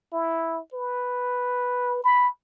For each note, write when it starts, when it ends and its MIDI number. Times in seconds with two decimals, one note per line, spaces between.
0.13 0.60 64
0.74 2.02 71
2.04 2.28 83